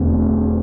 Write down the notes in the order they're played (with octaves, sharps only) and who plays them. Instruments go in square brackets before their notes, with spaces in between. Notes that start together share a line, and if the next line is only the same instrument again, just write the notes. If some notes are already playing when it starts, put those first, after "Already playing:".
Already playing: [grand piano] E1 E2 D3 [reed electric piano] A3 C4